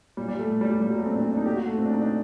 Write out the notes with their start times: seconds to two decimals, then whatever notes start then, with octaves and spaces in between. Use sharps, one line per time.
0.17 A#2 G3
0.28 G3
0.39 A3
0.50 A#2
0.61 G3
0.71 G3
0.81 A#2 G3
0.90 F#3
0.98 A3
1.06 C4
1.14 A#2 D4
1.22 C4
1.30 D4
1.37 D#4
1.46 A#2 G4
1.57 F#4
1.67 A3
1.78 A#2 C4
1.85 D4
1.93 D#4
2.02 D4